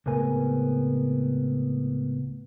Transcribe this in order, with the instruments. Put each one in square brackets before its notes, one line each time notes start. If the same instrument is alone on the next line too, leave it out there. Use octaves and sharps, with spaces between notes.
[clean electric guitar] C#2 A2 B3 C4 A#4 G#5